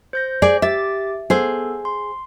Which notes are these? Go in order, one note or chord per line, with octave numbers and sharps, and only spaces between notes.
C5 G6 A#6
G#4 D5
G4 E5 D6 A6
B3 G#4 A4 C5
C6